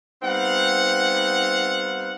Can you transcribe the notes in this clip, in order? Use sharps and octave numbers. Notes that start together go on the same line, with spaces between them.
G3 B3 C4 D#4 F5 F#5